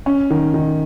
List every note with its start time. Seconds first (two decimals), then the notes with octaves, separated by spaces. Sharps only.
0.06 C#4
0.30 D#3
0.54 D#3